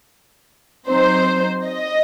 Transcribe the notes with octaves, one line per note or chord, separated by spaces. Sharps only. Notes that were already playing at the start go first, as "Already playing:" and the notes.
F#3 C4 D#4 C5
D#5